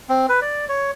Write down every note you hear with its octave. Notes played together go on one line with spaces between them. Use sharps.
C4
B4
D5
C#5